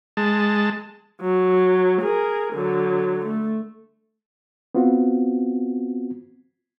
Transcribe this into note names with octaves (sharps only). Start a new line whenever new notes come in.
G#3 A5
F#3
G#4 A#4
D3 F#3
A3
B3 C4 F4 F#4